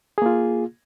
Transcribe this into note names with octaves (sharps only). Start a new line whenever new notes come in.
A#3 F4 G#4